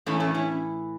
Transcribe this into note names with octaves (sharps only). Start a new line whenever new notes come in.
A2 E3 A3 C#4
A3 C#4
C#4 E4